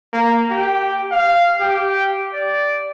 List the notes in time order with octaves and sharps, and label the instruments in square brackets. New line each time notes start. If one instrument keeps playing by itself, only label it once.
[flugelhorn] A#3
G4
F5
G4
D5